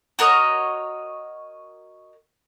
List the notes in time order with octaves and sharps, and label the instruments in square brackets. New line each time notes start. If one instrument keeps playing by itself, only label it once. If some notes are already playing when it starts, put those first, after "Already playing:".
[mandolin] F#4 A#4 C#5 D#5